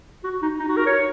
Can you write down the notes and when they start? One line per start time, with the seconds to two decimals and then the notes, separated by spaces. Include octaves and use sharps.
0.24 F#4
0.42 D#4
0.59 D#4
0.68 F#4
0.77 A#4
0.86 C#5